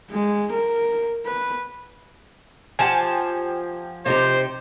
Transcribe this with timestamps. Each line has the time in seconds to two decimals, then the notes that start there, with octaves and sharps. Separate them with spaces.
0.11 G#3
0.52 A#4
1.26 B4
2.79 F3 G4 F#5 G#5 A5
4.06 C3 D#4 G4 C5